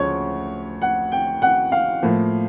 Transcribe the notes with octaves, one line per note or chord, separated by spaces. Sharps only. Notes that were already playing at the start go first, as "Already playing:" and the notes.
Already playing: D2 C#3 F3 G#3 C#5
F#5
G5
F#5
F5
A2 F3 A#3